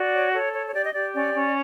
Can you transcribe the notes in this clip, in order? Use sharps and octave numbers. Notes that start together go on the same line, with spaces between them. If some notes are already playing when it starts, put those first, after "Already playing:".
Already playing: F#4 D5
C#5
A4 C#5
C#5
C#5
G4 D5
D#5
G4 D5
C#4 D5
C#4